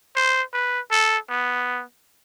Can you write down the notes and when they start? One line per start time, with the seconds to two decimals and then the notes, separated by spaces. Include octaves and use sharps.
0.16 C5
0.54 B4
0.91 A4
1.29 B3